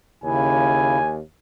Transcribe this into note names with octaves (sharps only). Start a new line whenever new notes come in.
D#2 C#3 E4 G#5